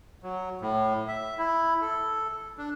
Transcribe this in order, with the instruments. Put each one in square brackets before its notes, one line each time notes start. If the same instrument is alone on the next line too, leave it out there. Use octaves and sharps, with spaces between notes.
[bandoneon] F#3
A2
E5
E4
A4
D4